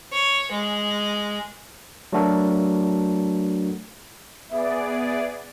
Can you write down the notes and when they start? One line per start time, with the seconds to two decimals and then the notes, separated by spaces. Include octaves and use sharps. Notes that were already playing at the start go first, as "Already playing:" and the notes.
0.12 C#5
0.52 G#3
2.13 F#3 A3 D4 F#4 A4 A#4
4.50 B3 G#4 D5 E5